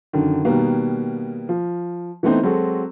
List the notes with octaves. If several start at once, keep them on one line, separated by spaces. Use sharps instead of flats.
F#2 D3 D#3
B2 D#3 G3 A#3 B3
F3
E3 A3 B3 C4 D#4
F#3 G#3 C4 F#4 A4